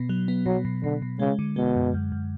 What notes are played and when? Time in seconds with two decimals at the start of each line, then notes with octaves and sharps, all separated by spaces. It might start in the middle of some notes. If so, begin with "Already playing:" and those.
Already playing: B2 B3
0.09 F#3
0.28 B3
0.46 B2 F#3
0.65 B2
0.83 B2 D3
1.02 B2
1.19 C#3 G#3
1.39 D3
1.56 B2 G#3
1.76 F#2
1.94 F#2
2.12 F#2